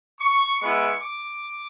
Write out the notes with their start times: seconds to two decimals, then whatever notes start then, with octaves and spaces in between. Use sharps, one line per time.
0.20 C#6
0.60 G#3 B3 E4 C#6
1.01 D6